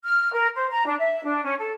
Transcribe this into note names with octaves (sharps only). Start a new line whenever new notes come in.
F6
A#4
C5
A#5
D4
E5
D4
C#4
A4